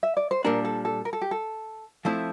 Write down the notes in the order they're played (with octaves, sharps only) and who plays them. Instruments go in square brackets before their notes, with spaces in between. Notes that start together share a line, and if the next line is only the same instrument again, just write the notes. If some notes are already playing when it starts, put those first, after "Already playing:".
[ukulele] E5
D5
C5
[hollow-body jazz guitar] A#2 G3 D4 [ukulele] A#4
[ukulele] A4
A4
A#4
A4
G4
A4
[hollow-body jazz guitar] F3 A3 C4 E4